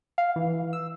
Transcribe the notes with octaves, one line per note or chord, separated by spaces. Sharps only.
F5
E3
E6